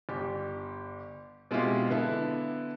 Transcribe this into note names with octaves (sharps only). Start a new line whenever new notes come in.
G1 G4
B2 G#3 C4 E4 F4 G4
D3 B3 E4 A4